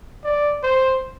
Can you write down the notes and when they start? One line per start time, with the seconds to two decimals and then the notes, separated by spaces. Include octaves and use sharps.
0.24 D5
0.63 C5